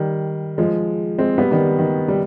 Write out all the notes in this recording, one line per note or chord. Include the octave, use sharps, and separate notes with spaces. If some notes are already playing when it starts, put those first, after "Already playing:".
Already playing: D#3 G3
F3 G#3
G#3 C4
G3 B3
D#3 G3
D#3
G3